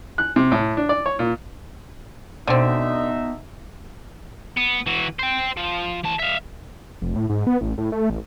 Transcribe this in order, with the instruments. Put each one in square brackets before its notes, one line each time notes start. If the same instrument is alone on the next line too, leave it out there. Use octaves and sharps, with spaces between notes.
[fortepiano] F#6
C3
A2
D4
D5
C#5
A#2
[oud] B2 [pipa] D3 C4 [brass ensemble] D#4 E5
[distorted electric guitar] B3
E3 F#4
C5 G5
F3
E3 A5
E5 F5
[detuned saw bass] F1
A2
G#2
B3
A1
A2
A3
A1